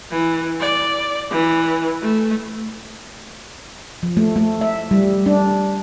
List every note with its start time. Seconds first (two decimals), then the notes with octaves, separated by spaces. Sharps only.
0.11 E3
0.60 D5
1.30 E3
2.02 A3
4.03 F3
4.17 A3
4.36 A3
4.61 E5
4.91 G3
5.26 D4